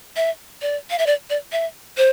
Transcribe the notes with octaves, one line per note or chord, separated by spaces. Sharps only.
E5
D5
F5
E5
D5
D5
E5
C5